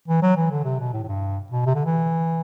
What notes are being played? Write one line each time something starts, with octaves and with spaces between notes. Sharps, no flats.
E3
F#3
E3
D3
C3
B2
A2
A2
G2
B2
C3
D3
E3